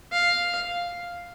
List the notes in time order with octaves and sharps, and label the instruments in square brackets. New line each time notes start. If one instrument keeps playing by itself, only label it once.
[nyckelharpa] F5